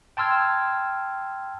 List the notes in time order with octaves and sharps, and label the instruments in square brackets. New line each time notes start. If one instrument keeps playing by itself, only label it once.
[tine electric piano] G5 A5 C6 E6 F6 G#6